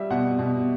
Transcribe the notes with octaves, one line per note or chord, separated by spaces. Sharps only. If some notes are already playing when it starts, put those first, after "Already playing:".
Already playing: G3 E5
B2 F#5
B2